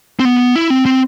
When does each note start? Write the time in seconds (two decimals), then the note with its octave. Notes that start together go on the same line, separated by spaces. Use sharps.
0.20 C4
0.25 B3
0.56 E4
0.70 C4
0.85 C4